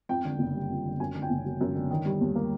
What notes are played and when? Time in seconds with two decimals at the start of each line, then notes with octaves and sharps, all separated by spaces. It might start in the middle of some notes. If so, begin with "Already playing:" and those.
0.09 F2 G5
0.25 D3
0.39 F#1
0.55 G3
0.70 F2
0.85 D3
1.00 F#2 G#5
1.15 D3
1.22 G5
1.30 F#1
1.45 F#3
1.61 F#2
1.75 D3
1.91 D#3
2.05 G3
2.21 D#2
2.35 A#3